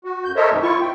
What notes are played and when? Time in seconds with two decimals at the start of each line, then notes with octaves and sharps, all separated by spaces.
0.04 F#4
0.24 F#2 G6
0.36 A4 A#4 C5 C#5 D#5 E5
0.51 F#2 B2 D#3 G#3 A#3
0.62 E4 F4 C#6
0.81 C4 G5